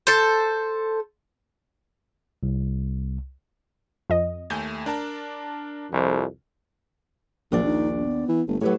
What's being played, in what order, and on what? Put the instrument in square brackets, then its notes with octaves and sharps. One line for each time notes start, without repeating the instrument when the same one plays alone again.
[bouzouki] A4 C5
[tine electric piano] C2
[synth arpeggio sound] F2 D#5
[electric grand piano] D#2 A3 G#5 [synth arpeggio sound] G6
[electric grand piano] D4 A#4 A5
[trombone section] C2 F2
[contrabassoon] A#1 [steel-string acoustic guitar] D#2 D4 D5 [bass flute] F3
[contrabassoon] A#1 [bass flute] D#4
[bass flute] B3
[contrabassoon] E3
[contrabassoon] G1 [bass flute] A3
[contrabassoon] A2 [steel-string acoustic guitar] F#3 B4 C#5 [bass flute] G4